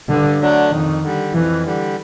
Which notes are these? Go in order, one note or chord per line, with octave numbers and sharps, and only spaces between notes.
G2 D3
D3 F#3 A3 D4
F2 D#3
D3 G3
F2 E3
D3 G3